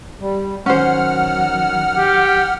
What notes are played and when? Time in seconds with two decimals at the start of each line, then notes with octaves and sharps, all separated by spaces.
0.20 G3
0.66 D#3 F#3 C#4 C5 F#5 F6
1.97 G4